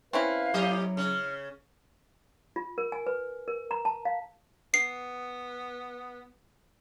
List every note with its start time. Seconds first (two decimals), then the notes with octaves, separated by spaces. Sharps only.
0.13 C4 C#4 E4 B4 F5
0.54 A2 F#3 G4 D#5
0.97 C#3 F6
2.56 F4
2.78 A#4
2.92 G#5
3.07 B4
3.48 A#4
3.71 A#5
3.85 A5
4.05 F5
4.74 B3 C7